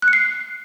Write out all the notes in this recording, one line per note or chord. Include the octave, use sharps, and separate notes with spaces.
F#6
C#7
C7